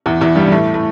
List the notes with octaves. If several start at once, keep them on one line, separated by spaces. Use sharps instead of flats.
E2 E3
E2 E3
G2 G3
G3
A2 A3
A2 A3